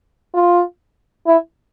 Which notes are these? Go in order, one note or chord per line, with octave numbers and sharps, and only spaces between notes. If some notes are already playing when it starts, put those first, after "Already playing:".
F4
E4